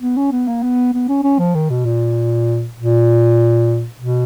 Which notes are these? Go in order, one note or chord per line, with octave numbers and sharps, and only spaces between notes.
B3
C#4
B3
A#3
B3
B3
C#4
C#4
F3
D#3
B2
A#2
A#2
B2